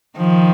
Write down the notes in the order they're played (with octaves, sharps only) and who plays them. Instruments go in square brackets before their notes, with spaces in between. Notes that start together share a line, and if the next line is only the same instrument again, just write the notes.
[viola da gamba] D#3 F3